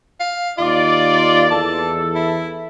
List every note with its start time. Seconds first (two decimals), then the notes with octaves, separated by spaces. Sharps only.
0.20 F5
0.58 D#2 D#4 F4 D5
1.51 E2 E3 A4 A5
2.15 E4